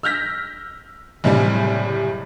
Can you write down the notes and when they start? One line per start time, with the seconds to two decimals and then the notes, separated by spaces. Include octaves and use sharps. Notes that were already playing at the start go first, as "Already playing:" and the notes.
0.03 E6 F6 G6 A#6 B6
1.24 F#1 A2 C3 G3 G#5